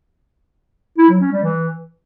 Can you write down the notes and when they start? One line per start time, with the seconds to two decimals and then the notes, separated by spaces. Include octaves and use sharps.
0.98 E4
1.09 F#3
1.21 C#4
1.32 G3
1.43 E3